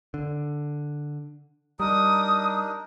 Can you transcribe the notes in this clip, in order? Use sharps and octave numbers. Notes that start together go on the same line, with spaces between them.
D3
G3 D4 D#4 A#4 D#6